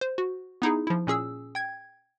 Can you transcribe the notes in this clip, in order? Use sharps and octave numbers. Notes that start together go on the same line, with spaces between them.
C5
F#4
B3 D#4 E4 G#4
F3 E4
A#2 C#4 G#4 E6
G5 G#6